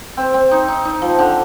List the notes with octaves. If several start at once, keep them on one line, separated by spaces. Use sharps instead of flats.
C4
C4
D#4
D#4
D#4
F3
D3